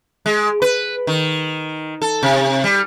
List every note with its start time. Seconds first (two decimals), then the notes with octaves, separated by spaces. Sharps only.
0.26 G#3
0.62 B4
1.07 D#3
2.02 A4
2.23 C3
2.64 G3